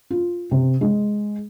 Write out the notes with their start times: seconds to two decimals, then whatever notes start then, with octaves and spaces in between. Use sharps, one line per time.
0.10 F4
0.51 C3
0.81 G#3